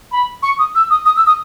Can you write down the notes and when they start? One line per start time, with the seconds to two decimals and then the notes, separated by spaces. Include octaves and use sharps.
0.11 B5
0.43 C#6
0.59 D#6
0.75 E6
0.90 D#6
1.05 D#6
1.16 E6
1.26 D#6